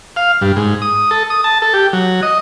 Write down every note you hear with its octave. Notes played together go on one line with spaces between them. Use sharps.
F5
G2
G#2
D#6
A4
D#6
A5
A4
G4
F#3
D#5